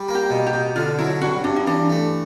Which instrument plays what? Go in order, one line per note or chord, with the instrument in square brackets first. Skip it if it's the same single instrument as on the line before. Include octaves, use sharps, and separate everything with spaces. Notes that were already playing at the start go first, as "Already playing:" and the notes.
Already playing: [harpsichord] G3
A#3
[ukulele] G4
[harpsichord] B2
[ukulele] G4
[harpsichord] B2
[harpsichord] D3 [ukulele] F4
[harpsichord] F#3 [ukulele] E4
[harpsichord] G2 [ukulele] F#4
[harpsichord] G2 [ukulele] D4
[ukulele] D#4
[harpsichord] E3 [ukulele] D4
[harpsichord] A3